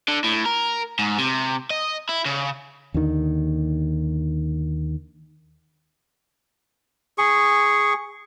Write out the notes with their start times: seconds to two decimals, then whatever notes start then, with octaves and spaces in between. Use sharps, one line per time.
0.08 D3
0.24 A2
0.45 A#4
0.99 G#2
1.18 C3
1.70 D#5
2.09 E4
2.25 C#3
2.94 D#2 D3 D#3
7.18 G#4 C#6